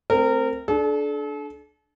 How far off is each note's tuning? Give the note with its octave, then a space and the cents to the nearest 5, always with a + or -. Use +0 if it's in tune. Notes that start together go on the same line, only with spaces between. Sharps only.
A3 +0 C4 +0 A#4 -25
D4 +0 A4 -40